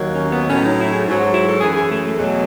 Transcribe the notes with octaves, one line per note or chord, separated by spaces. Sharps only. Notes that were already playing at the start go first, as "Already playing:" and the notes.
Already playing: D#2 D#3 F#3
C#4
B3
A2 F#3 C#4
D#4
E4
G#4
G#2 F#3 G#4
F#4
E4
A4
F#2 E3 G#4
G#4
A3
A3
E2 B2 F#3